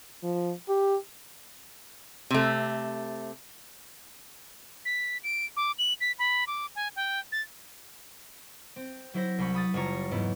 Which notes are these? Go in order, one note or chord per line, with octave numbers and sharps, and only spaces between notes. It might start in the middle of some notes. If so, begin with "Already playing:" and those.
F3
G4
C3 A3
B6
D7
D6
F#7
B6
B5
D6
G#5
G5
A6
C4
F#3 E4 C5 A#6
C2 C5 B5 C#6
B5 D#6 A6
F#1 G3 F4 C#5 A#5
E2 G#2 B3 E4